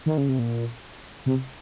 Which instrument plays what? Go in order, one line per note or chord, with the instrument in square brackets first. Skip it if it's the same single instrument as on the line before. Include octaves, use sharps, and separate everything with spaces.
[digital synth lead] D#3
C#3
C3
A#2
C3